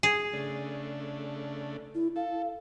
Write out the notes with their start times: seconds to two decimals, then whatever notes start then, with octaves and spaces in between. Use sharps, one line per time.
0.03 G#4
0.33 C#3 A3 D4
1.95 E4
2.16 A4 F5